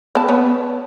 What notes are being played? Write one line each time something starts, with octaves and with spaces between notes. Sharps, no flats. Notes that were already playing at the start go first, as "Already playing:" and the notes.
B3 A5
B3 B4 C#5